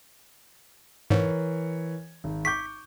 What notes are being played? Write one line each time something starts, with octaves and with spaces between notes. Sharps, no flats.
G#2 E3 A#4 C#5
G#1
C#6 D6 G6 B6